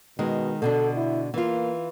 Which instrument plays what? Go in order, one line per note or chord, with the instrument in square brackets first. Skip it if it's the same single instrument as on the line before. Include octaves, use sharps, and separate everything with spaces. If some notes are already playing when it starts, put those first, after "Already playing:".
[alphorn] B2 [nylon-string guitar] D#3 G#3
[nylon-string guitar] B2 D3 D4 [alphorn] A4
[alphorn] E4
[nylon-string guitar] E3 F4 [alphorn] A#3